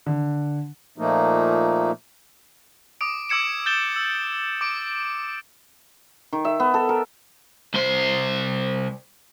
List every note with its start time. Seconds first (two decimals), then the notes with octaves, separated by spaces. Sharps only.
0.06 D3
0.98 A#2 F3 A3 A#3 D#4
3.01 D6 D#6 D7
3.29 D6 E6 G#6 C#7 E7
3.66 G6 A6 E7 G7
3.96 E6
4.61 D6 D7
6.33 D#3
6.45 E5
6.60 B3
6.74 A4
6.89 A#4
7.74 C2 C5